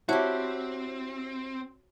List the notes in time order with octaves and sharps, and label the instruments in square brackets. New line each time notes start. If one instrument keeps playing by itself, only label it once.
[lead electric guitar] C4 [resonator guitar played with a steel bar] E4 G4 [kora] F#4 [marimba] C5 C#5 A5